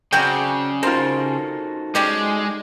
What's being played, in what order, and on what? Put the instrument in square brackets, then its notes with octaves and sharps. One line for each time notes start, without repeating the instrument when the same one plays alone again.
[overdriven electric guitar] C#3 [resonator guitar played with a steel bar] F#3 D5 [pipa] C4 F#4 G5
[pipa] C4 [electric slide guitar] D#4 F#4 A4 [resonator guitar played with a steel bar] F4 A#4 C5
[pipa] G3 C#4 G4 [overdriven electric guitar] G#3